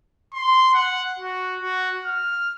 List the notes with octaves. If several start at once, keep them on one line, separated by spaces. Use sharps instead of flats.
C6
F#5
F#4
F#4
F6